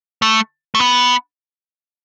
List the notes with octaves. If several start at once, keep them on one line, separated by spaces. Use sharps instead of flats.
A3
A3
B3